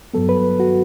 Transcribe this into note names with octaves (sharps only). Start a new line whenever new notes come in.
G2 F#3 B3 A4
B4
F#4